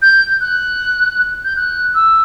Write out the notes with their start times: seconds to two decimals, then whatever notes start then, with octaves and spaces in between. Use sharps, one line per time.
0.02 G6
0.41 F#6
1.44 G6
1.56 F#6
1.95 E6